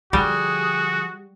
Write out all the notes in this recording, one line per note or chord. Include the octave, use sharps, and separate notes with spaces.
D3 F3 G3 F#4 G#4